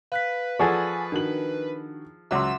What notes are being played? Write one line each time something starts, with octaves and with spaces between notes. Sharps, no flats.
B4 F5 F#6 B6
F3 G#4 A4 D5 F#5 G#5 C#6 A6
D#3 D4 F#4 F#7
C#2 F#3 E5 F#5 C6 E6